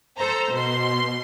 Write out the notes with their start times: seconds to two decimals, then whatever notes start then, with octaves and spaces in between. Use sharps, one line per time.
0.17 A4 C5 A#5
0.54 B2 C6